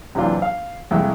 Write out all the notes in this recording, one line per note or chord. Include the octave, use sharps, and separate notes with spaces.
F#2 C3 E3 D4 F4
F5
C2 F2 G#3 E4 E5 G5